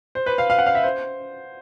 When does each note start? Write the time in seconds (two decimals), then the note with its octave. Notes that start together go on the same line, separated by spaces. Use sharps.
0.15 C5
0.26 B4
0.38 F5
0.50 F5
0.59 F#5
0.66 F5
0.75 E5
0.83 C5